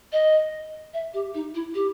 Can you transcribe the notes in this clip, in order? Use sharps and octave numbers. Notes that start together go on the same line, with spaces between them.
D#5
E5
G4
D#4
E4
G4